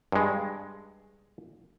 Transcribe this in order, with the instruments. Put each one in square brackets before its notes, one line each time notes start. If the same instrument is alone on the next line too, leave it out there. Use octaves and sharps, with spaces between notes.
[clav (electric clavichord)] G2 G#3